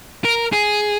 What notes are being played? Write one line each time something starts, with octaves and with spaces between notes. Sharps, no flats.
A#4
G#4